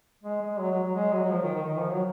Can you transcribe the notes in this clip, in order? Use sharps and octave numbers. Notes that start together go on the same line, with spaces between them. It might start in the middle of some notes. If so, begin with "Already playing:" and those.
G#3
G#3
F#3
F#3
F#3
G#3
F#3
F#3
F3
D#3
D#3
D#3
F3
F#3